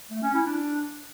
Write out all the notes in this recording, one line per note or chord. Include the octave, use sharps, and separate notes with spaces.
A3
C#4
E4
D4